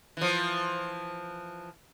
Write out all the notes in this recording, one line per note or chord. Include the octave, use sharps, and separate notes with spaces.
E3 F3